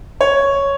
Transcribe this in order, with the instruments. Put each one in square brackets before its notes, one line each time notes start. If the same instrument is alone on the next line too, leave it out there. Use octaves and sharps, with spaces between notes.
[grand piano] C#5